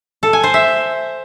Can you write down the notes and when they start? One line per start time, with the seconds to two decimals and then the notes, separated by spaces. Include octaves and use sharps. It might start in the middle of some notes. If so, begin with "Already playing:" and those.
0.23 A4
0.33 G#5
0.43 C5
0.54 E5